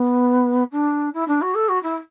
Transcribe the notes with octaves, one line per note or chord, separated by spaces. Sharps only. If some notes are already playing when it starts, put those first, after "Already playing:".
Already playing: B3
D4
E4
D4
F#4
A4
F#4
E4